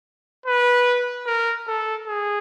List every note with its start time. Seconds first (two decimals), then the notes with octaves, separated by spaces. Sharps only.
0.46 B4
1.27 A#4
1.67 A4
2.07 G#4